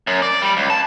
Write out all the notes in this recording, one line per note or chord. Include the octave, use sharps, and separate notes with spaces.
F#2
D5
G3
C#2
A5